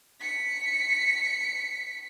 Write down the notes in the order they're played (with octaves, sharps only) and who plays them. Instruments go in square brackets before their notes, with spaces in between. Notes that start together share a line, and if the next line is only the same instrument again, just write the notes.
[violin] B6 C#7